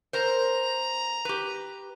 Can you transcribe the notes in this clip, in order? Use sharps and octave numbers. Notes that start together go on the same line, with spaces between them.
A#4 C5 A#5
G4 B4